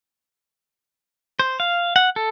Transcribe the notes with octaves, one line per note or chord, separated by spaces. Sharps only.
C5
F5
F#5
A4